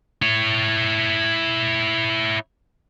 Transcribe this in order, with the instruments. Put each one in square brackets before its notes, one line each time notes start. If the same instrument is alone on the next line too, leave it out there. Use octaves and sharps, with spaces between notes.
[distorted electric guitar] E4 C#5